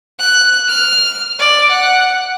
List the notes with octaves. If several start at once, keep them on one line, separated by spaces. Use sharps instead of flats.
F#6
F6
D5
F#5